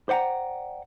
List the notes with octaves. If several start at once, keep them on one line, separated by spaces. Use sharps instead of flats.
C5 D5 F#5 G5 A#5